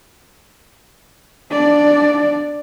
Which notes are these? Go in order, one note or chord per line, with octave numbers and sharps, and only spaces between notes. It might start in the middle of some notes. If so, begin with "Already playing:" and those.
D4 D5